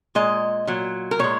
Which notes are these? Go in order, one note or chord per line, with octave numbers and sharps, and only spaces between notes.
A#2 G#3 D#5
A#2 F#3
A#4
A#2 G#3 C#5